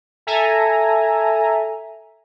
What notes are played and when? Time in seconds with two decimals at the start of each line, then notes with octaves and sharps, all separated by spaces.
0.27 A4 E5 G#5 A#5